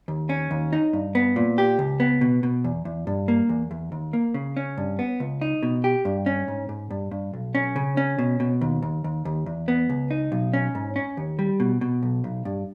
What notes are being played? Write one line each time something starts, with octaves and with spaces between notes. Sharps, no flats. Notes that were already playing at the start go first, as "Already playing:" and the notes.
D#2
C#4
D#2
D#4
G2
B3
A#2
G4
C#2
B3
B2
B2
E2
E2
G2
A#3
E2
E2
D#2
A#3
C#3
C#4
G2
B3
C#2
D#4
B2
G4
G2
C#4
G#2
G#2
G2
G2
B1
C#4
C#3
C#4
B2
B2
D#2
D#2
D#2
D#2
E2
B3
C#2
D#4
B1
C#4
G#2
C#4
D#2
G3
B2
B2
B1
B1
G2